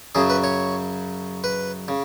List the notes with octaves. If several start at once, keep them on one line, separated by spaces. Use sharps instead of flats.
F#2 C#3 F#3 G#4
B4
C#5
B4
C#3